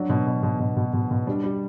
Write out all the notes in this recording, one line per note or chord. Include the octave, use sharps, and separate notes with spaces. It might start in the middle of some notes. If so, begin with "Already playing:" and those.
Already playing: F#3 D4
B2
B2
B2
B2
B2
B2
B2
G3 D4
G3